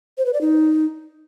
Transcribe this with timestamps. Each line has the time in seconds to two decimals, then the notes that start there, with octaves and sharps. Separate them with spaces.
0.18 C5
0.26 B4
0.33 D5
0.41 D#4